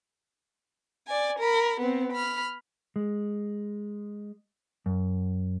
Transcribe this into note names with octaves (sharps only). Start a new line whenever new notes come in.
D5 G#5
A#4 B5
B3 C4
B5 F6
G#3
F#2